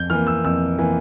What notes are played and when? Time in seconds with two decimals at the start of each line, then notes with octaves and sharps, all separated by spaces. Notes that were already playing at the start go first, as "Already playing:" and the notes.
Already playing: F2 G6
0.10 E3 A#3 F6
0.27 E6
0.44 F2 E6
0.78 E3 A#3